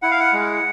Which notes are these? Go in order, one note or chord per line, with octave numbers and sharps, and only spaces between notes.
E4 F#5
F5
F#5
G#3